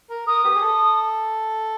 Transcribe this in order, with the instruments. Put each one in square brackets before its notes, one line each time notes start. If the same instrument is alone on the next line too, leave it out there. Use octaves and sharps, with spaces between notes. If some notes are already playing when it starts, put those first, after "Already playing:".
[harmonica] A#4
[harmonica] A#4 [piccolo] D#6
[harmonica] B3 G4
G#4
A4